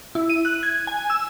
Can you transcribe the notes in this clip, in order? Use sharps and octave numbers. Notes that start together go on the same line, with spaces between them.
E4
D#7
F#6
G#6
G#5
E6